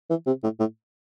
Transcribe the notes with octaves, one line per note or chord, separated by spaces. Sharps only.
E3
C3
A2
A2